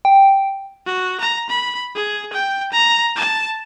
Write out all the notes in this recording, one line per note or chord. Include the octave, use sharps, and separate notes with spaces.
G5
F#4
A#5
B5
G#4
G5
A#5
A5